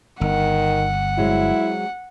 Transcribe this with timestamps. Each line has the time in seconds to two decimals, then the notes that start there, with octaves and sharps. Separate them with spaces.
0.21 G1 D#3 F#5
1.18 F#3 G#3 C4 E4